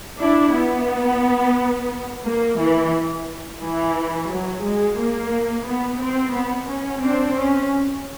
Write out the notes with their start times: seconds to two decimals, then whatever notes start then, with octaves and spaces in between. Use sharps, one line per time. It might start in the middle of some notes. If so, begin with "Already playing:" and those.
0.20 D4 E4
0.54 B3
2.25 A#3
2.58 E3
3.62 E3
4.30 F#3
4.64 G#3
4.98 A#3
5.66 B3
6.01 C4
6.35 B3
6.69 C#4
7.03 C4 D4
7.37 C#4